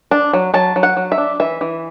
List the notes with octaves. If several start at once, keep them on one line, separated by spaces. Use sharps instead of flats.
D4
F#3
F#3 A5
F#3
F#5
F#3
E5
D4
E3 E5
E3